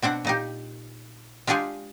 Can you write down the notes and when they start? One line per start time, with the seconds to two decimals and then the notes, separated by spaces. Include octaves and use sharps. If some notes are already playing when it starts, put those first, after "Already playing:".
0.02 B2 C4 D4 F#5
0.25 A#2 D#4 G4
1.47 G#3 D4 F4 G4 G#4